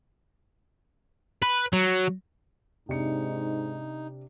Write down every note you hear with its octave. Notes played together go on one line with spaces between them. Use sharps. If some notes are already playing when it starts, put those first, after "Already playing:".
B4
F#3
G#2 C3 D4 D#4 C#7